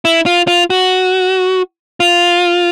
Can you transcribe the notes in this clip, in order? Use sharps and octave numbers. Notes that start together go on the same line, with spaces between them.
E4
F4
F4
F#4
F4